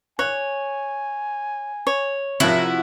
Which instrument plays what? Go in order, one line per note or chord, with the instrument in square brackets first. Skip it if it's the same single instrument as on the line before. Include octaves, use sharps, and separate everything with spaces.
[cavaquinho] C#5 [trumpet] G#5 [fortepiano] F#6
[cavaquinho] C#5
[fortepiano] C3 F3 [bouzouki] E4 F#4 [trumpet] A#4